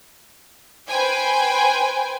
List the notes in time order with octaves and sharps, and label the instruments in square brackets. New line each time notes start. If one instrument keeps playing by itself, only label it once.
[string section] B4 C5 G5 G#5